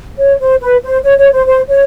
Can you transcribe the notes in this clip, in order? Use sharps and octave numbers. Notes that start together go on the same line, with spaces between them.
C#5
C5
B4
C5
C#5
C#5
C5
C5
C#5